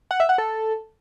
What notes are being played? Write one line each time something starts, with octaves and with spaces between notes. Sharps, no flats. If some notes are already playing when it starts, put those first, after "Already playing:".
F#5
E5
F#5
A4